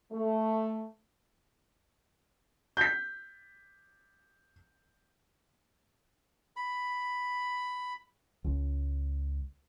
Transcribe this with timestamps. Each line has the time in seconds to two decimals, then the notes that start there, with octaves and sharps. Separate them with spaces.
0.10 A3
2.77 G6 B6
6.56 B5
8.44 C#2